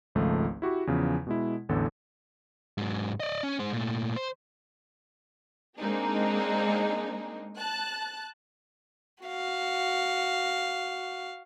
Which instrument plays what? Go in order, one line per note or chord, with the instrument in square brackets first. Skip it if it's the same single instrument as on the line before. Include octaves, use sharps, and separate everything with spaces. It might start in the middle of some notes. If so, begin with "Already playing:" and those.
[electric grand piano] G#1 C#2 F3 A3
E4 F#4 G4 C#6
E2 C#3 F3
B2 G#3 E4
A1 E2 D3 A4
[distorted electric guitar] G#2 F#3
D5 D#5
C#4
G#3 C5
A#2 A3
C5
[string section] G#3 A#3 C4 D4 D#4 G#4
A5 F#6
[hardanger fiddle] F#4 F5